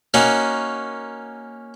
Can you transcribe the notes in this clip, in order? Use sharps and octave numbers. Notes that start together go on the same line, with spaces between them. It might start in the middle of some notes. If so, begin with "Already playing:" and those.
A#3 C#4 D#4 F#4